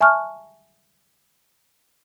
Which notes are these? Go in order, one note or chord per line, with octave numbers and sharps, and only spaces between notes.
E5 G#5 A5 C#6 F6 F#6